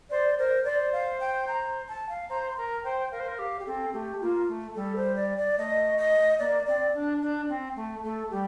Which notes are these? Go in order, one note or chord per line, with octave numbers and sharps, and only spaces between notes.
C5 D5
A#4 C5
C5 D5
F5
G5
A#5
A5
F5
C5 A#5
C6
A#4 A#5
C5 G5
A#4 F5
C5
A#4
G4 F5
G4
C4 A4
A3 G4
A#3 F4
A3
G3 A4
C5
D5
D5
A3 D#5
D#5
A#3 D5
C4 D5
D4
D4
C4
A3
A3 A4
G3 G4